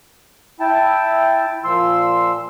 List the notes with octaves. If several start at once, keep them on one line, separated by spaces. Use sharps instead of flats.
E4 G5 A5
A#2 F3 C6 E6